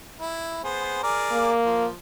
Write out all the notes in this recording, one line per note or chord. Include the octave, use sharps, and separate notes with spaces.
E4
B3 G#4 C5
G#4 A#4 D5
A#3
F3